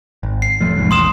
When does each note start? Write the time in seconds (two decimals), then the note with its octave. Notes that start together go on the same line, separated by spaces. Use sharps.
0.23 G#1
0.42 C7
0.61 E1 F3 A3
0.77 B1 E2 G#2
0.91 A#1 E2 C6 D#6 E7